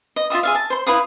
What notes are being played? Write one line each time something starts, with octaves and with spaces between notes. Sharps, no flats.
D#5
F4 F#4 E5 D#6
G#4 E5 F5
A5
C5 C6
E4 B4 F5 D#6